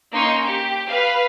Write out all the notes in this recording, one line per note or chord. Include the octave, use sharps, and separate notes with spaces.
A#3 C#4 D#4 C6 C#6 C#7
G4
B4 F5